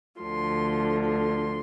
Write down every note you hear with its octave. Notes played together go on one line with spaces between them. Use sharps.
D2 D3 F3 C6
C6